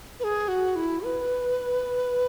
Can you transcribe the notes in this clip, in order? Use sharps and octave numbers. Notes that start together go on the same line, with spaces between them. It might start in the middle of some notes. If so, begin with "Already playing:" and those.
B4
G#4
F#4
E4
B4